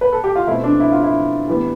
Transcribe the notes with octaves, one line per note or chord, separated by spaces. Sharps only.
B4
A4
G4
F4
B2 A3 C4 E4
D4
E4
F4
E4
A2 E3 G3 B3